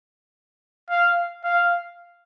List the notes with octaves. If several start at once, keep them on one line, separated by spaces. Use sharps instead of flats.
F5
F5